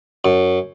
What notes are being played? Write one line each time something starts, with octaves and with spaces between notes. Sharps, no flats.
F#2